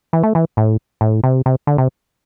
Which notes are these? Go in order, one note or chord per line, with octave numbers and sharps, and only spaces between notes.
E3
A3
E3
A2
A2
C3
C3
D3
C3